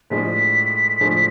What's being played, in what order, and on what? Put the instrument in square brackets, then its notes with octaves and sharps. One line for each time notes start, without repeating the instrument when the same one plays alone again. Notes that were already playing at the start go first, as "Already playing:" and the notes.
[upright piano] A2 F3 G#3 D4 G#4 [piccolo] B6
[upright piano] A2 F3 G#3 D4 G#4